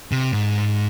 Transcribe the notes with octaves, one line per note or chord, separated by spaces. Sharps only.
C3
G#2